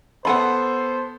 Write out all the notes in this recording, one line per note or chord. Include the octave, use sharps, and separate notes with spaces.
B3 A4 C5 F#5 G#5 B5 C6